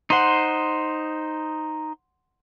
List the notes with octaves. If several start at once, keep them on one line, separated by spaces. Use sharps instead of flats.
D#4 C5 F#5 C6